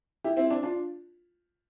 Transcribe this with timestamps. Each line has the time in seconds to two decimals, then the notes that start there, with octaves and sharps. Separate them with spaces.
0.24 E4 G4
0.37 C4 E4
0.50 D4
0.63 D4 F4